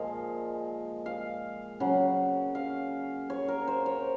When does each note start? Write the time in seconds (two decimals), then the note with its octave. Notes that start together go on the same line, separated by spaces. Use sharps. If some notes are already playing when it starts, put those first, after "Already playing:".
Already playing: A#2 F3 G#3 D#5 F5
1.06 F5
1.80 C#3 F#3 F#5
2.55 F5
3.30 C#5
3.48 A#4
3.68 C5
3.86 C#5